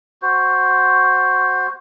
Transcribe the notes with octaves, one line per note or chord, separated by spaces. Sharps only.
F#4 C5